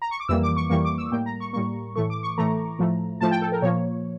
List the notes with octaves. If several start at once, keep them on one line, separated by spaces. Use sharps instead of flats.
A#5
C#6
D6
F2 E3 G3 A#3 E6
D6
C#6
F2 E3 G3 A#3 C#6
D6
E6
A2 G3 A#3 G5
A#5
C#6
A2 G3 A#3 C#6
A2 E3 A3 C#6
D6
C#6
A2 E3 A3 A#5
A2 F3 A3
A2 F3 A3 A5
G5
A4
A#4
A#2 F3 A#3 C#5